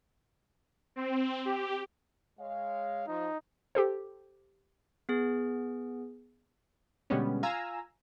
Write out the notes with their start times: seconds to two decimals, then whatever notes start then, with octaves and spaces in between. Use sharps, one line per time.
0.96 C4
1.45 G4
2.39 G#3 C#5 F5
3.07 F3 D#4
3.75 G4 A4 C5
5.09 B3 G#4
7.10 B2 D3 G3 G#3 B3 C#4
7.43 F4 F5 G#5 A#5 E6